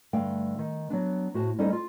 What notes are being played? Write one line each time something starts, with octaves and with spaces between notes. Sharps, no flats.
G2 D3 A3 F5 G5
D#3
F#3 B3 D4
A2 F#4 C5 A5
G3 C#4 D#4 A4 C5 D#5
F4